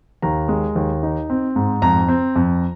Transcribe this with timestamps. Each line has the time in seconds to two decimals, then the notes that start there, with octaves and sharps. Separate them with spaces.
0.22 D#2 A#5
0.48 G#3
0.76 D#2
1.03 D#4
1.30 C4
1.56 G#2
1.82 F2 A#5
2.08 C4
2.36 F2